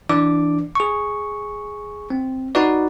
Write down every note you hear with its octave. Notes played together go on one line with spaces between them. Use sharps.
E3 D4 D5 D6
G#4 C#6
C4
D#4 F#4 B4 D5